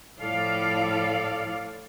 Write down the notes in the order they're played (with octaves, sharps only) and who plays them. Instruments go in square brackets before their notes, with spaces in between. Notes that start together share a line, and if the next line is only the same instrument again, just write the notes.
[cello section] A2 F3 A4 D5 F5